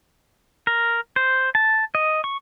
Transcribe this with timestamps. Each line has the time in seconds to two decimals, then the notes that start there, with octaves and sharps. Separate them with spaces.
0.67 A#4
1.16 C5
1.55 A5
1.95 D#5
2.24 C#6